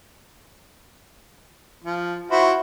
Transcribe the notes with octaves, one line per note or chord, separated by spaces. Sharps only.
F3
E4 F#4 C5